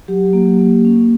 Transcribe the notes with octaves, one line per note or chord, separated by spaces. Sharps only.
F#3 G4
A#3
A#3
C#4